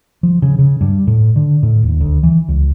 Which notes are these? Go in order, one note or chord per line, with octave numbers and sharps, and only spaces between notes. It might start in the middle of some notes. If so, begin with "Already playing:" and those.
F3
C#3
C#3
G2
A2
D3
A2
D#1
D2
E3
C#2